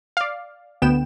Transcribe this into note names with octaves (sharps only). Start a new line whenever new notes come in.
D5 F5
D2 B3 G5 E7